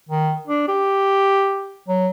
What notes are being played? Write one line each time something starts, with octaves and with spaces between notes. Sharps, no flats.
D#3
D4
G4
F#3